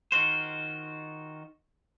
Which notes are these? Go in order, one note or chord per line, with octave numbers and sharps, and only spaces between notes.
D#3 D#4 F4 F#4 C5